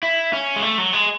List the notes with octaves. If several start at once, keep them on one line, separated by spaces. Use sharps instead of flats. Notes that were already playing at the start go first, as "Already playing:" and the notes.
E4
C#4
G#3
A3
F#3
G#3